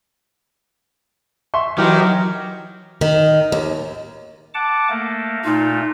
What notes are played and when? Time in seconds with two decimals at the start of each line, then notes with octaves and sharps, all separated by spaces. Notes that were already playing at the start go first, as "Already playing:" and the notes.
1.54 E5 C6 C#6
1.78 E3 F#3 D#4 G4 A#4
3.01 D#3
3.52 D#2
4.54 F#5 A5 D6
4.90 A3 A#3
5.45 A#2 A3 D#4 F4